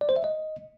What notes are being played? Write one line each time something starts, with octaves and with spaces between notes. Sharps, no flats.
D5
C5
E5
D#5